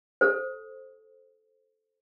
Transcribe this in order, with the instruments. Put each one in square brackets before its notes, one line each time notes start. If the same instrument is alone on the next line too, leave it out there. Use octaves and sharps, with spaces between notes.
[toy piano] A4 C5